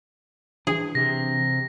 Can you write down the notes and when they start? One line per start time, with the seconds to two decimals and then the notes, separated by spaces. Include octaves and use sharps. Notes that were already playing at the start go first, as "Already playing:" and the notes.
0.67 E3 D4 G#4
0.95 C3 A#6